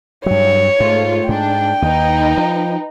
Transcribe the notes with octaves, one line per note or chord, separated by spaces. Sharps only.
G2 F#3 C#5
G#2 A3 F4
G#2 D4 G5
D#2 D#4 B4
F3